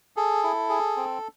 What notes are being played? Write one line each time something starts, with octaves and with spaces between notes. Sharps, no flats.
G#4 A4
E4
G#4
C4